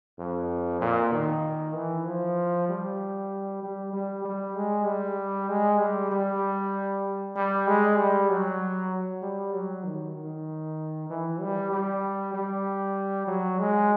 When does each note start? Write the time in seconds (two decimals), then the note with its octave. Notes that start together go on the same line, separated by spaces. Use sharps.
0.19 F2
0.81 A#2
1.13 D#3
1.74 E3
2.06 F3
2.69 G3
3.62 G3
3.93 G3
4.25 G3
4.56 G#3
4.86 G3
5.49 G#3
5.80 G3
6.11 G3
7.36 G3
7.67 G#3
7.97 G3
8.30 F#3
9.22 G3
9.54 F#3
9.84 D#3
10.16 D#3
11.10 E3
11.41 G3
11.72 G3
12.34 G3
13.27 F#3
13.59 G#3